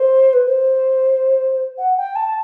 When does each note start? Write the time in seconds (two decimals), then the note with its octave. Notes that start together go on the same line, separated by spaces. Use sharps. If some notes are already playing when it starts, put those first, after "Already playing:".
Already playing: C5
0.33 B4
0.47 C5
1.78 F#5
1.97 G5
2.16 A5